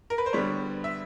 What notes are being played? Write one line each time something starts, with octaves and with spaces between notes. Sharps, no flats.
A#4
B4
C5
D3 G3 B3 C#5
E5